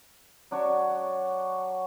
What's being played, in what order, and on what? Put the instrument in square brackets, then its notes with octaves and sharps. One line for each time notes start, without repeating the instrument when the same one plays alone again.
[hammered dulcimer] F#3 D4 F#4 C#5